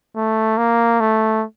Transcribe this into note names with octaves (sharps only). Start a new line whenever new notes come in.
A3
A#3
A3